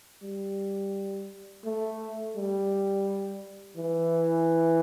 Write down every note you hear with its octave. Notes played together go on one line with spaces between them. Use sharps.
G3
A3
G3
E3